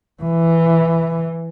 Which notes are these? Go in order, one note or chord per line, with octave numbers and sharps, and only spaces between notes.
E3